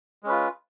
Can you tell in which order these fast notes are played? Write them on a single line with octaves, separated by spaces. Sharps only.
G#3 C#4 B4 F4